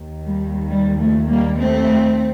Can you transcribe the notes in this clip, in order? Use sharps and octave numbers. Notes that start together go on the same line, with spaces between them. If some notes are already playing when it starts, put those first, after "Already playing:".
Already playing: D#2 D#3
G3
G3
F3 A3
G3 A#3
A3 C4